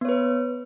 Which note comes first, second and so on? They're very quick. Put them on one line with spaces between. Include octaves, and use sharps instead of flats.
B3 C#5 B4